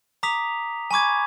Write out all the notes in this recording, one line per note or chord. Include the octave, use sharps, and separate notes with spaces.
A#5 D6 D#6 B6 F7
G#5 B5 C#6 D6 G#6